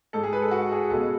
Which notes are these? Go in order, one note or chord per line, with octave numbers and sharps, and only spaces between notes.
G#2 G#3 A4
G#4
B4
A4
F#4
G#4
C#2 B2 G#3 A4